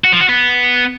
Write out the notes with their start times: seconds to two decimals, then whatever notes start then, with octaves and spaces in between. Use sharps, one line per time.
0.04 F#4
0.12 F3
0.21 F#4
0.29 B3